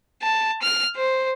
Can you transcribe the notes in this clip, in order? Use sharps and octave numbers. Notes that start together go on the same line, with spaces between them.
A5
F6
C5